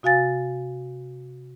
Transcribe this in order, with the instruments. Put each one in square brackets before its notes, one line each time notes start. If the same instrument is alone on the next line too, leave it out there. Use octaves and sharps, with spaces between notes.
[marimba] C3 F#4 F5 G#5 A6